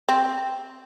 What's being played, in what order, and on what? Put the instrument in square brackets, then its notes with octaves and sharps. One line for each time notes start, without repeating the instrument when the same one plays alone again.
[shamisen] C4